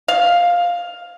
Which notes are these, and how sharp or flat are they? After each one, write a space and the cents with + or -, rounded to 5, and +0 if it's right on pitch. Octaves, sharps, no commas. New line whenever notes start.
F5 +5